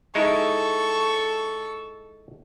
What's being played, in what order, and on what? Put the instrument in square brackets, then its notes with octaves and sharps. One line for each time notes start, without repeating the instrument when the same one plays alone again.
[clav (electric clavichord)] G#3 D#4 E4 [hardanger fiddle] A4 C#6